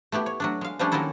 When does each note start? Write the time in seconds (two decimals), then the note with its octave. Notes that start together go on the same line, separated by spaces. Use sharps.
0.12 A3 B3 E4 G4
0.26 C#5
0.40 F#3 A3 D4
0.61 G#3 F5
0.79 F3 G3 A3 C#4 D4 G4
0.92 D#3 F#3 G#3 A#3 E4 A4